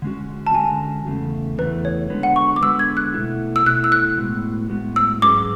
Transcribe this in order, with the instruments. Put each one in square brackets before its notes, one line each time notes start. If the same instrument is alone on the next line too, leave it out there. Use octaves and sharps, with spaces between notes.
[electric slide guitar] D3 G#3 C#4 F#4
[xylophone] A5
[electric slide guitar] D3 G#3 C#4 F#4 [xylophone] G#5
[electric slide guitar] E2 C#3 A3
[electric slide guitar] E2 C#3 E3 A3 [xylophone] B4
[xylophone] C#5
[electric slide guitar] D3 G#3 B3 F#4 B4
[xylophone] F#5
C#6
D6
[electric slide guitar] D3 G#3 B3 F#4 B4 [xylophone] E6
[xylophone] G#6
F#6
[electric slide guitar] B2 A3 E4
[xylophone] E6
[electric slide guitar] B2 A3 E4 [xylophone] F#6
[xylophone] E6
F#6
[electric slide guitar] A2 G#3 B3 F#4
A2 G#3 B3 F#4
[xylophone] E6
[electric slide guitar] G#2 F#3 C#4 G#4 B4 [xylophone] D6